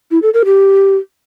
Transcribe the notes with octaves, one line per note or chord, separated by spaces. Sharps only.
E4
A4
A#4
G4